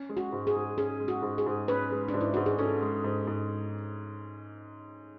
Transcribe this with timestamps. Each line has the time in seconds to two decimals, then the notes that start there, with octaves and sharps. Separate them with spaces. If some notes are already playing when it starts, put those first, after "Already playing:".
Already playing: C#4
0.09 G#3
0.17 F#4
0.33 G#2
0.47 G#4
0.55 G#2
0.78 C#4 G#4
1.00 G#3
1.08 F#4
1.22 G#2
1.38 G#4
1.46 G#2
1.68 C#4 B4
1.92 G#3
2.08 D4
2.14 G#2
2.21 E4
2.34 G#2 F#4
2.46 G#4
2.59 C#4 A4
2.82 G#3
3.04 G#2
3.27 G#2